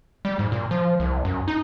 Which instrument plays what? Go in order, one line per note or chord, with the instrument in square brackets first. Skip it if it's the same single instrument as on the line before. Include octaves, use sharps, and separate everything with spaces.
[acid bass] G3
G#2
A#2
F3
C2
F#2
D#4